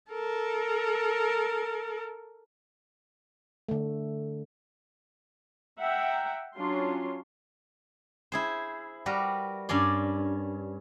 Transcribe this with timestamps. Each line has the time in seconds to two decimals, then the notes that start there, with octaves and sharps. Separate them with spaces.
0.12 A4 A#4
3.69 D3 A3
5.78 E5 F#5 G5 A#5
6.55 F#3 C#4 D4 F4 C6
8.32 E4 G#4 C5
9.06 G3 F#4 A#4 B4
9.69 G2 C#4 D5 C6